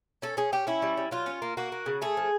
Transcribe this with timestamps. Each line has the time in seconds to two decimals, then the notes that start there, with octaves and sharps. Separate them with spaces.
0.22 C#4 A4
0.37 C#4 G#4
0.52 C#4 G4
0.67 C#4 E4
0.82 G3
0.97 G3
1.11 F#3 F4
1.26 C#4
1.42 A#3
1.57 A#3 F#4
1.72 A#3
1.86 C#3
2.02 A3 G#4
2.17 F3